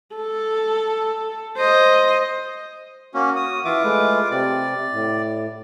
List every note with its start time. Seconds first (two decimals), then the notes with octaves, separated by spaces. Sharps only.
0.16 A4
1.57 C5 D#5
3.14 A#3 C#4 F#4
3.36 D#6
3.65 E3 F4 E5 D6
3.83 G#3 A3 B4
4.31 C3 C4 D5
4.92 A2